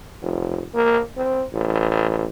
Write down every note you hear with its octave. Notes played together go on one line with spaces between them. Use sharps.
F1
A#3
C4
A1